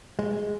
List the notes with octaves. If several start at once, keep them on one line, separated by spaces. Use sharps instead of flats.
G#3